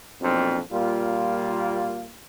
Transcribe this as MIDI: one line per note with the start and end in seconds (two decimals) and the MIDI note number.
0.22 0.59 35
0.22 0.59 41
0.22 0.59 46
0.22 0.59 60
0.22 0.59 62
0.72 2.08 46
0.72 2.08 55
0.72 2.08 58
0.72 2.08 65